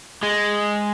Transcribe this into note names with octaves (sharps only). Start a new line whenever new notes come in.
G#3